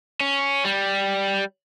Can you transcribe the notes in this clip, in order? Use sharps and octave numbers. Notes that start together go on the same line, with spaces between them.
C#4
G3